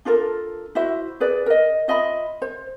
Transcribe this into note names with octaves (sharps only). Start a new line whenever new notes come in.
D4 F4 A4 A#4
E4 F#4 C5 E5
G#4 B4 D5
A#4 D#5
F4 D#5 E5 B5
C5